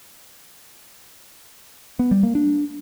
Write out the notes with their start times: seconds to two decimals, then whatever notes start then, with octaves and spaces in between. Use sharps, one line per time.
1.99 B3
2.11 G3
2.23 A#3
2.35 D4